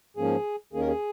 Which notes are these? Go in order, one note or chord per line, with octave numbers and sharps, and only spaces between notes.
G#2 F3 A#3 C#4 G#4
D#2 D#3 A#3 C#4 G#4
A#4
G#4